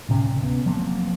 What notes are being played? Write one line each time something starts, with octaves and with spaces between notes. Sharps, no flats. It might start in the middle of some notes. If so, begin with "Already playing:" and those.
D1 C3 C#4
B3
F3 F#3 A#3 C4